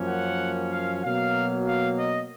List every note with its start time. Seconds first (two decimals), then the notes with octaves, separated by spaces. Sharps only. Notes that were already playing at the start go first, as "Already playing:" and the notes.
Already playing: F#2 F3 A#3 C#4
0.08 F#5
0.71 F5
1.03 B2 F#3 A#3 F5
1.67 F5
1.98 D#5